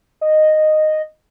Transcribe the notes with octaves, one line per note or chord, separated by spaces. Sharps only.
D#5